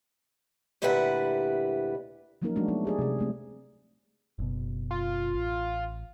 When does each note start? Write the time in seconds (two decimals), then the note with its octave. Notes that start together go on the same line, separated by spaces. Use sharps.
0.82 D2 A#2 G3 E4 B4 F#5
2.42 F3 F#3 A#3 C#4 D#4 A#4
2.56 F3 F#3 G#3 A3 D4 F#4
2.68 B3 D#4
2.85 G4 G#4 D5
2.99 C3 G#4
3.19 G#3 A3 C4
4.38 F#1 B2
4.91 F4
5.34 A1